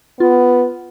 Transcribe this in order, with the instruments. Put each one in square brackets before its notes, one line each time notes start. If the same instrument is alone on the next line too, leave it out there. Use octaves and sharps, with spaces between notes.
[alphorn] B3 [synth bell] F4